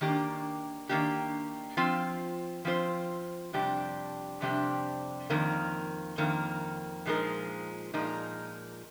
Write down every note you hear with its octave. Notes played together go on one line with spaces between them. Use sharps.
D#3 A#3 D4 G4
D#3 A#3 D4 G4
F3 C4 F4 C5
F3 C4 F4 C5
F2 C3 G3 D4 G4
F2 C3 G3 D4 G4
F2 D#3 A#3
F2 D#3 A#3
A#2 F3 G#3 D#4 A#4
A#2 F3 G#3 D#4 A#4